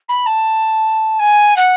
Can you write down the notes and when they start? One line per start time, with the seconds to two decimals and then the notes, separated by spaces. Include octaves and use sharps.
0.08 B5
0.26 A5
1.19 G#5
1.56 F#5